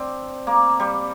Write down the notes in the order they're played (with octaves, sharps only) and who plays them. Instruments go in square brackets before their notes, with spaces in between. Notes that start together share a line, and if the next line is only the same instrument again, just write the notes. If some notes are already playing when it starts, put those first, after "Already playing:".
Already playing: [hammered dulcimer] C4 D4
A#3
G3